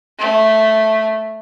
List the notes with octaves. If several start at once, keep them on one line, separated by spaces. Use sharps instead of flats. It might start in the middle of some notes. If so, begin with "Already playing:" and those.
A3